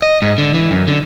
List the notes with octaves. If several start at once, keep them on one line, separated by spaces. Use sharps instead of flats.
D#5
G#2
D3
E3
F#2
D3